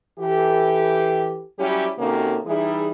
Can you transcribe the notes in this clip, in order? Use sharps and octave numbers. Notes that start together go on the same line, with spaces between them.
E3 G4 A4
F#3 G3 C#4 E4 G4
C3 D#3 A#3 C#4 F#4 A4
E3 G3 D#4 E4 G#4